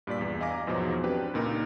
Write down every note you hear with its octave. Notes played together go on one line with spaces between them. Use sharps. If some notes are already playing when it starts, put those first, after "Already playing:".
G2 A#2 D5 B6
E2
D#5 F5 G#5 A#5 D6 A#6
E2 G#2 B2 F3 F#3
C4 D4 G4 B4
C#2 A#2 D#4 A#4